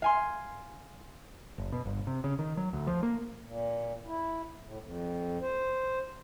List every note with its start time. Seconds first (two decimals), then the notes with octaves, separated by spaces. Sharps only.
0.02 F5 G#5 C6
1.58 F#1
1.72 B2
1.86 G1
2.07 C3
2.24 C#3
2.39 D#3
2.57 F#3
2.73 D2
2.87 F3
3.03 A#3
3.44 A#2
4.06 E4
4.63 A2
4.81 F2
5.41 C5